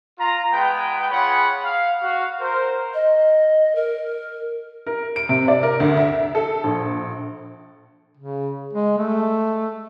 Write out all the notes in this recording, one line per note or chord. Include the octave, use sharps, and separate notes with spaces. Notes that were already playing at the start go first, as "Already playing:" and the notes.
F4 A#5
G#3 B3 B4 G5
F4 G#4 C#5 F#5 B5
F5
F#4 F5
A#4 C5
D#5
A#4
A#4
D7
C3
D5
A#4
D2
E5
A4
A#1
C#3
G#3
A3